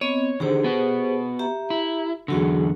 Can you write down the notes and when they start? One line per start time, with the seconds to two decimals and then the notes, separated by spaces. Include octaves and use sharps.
0.01 B3 C4 C#5 D#5
0.40 D3 D#3 G4 G#4 C5
0.64 B3 F#4
1.39 G4 E5 A#5
1.70 E4
2.28 E2 D3 F#3 F#4 G#4